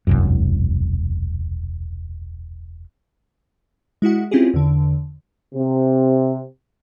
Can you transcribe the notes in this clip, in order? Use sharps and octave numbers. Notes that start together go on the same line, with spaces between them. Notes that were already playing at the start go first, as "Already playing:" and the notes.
E1 C2 F#2
G#3 E4 F#4 F#5
C4 C#4 E4 F4 G4 G#4
E2 D3
C3